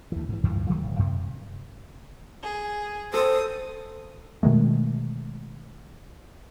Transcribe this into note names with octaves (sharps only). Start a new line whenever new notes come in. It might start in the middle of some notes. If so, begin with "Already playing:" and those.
D2 E3
G#2 E3
D2 G2 E3 F3
D#3 F3 F#3 A3
D1
F#2 C3
G#4
A4 C5 D#6
B2 D#3 G#3 A3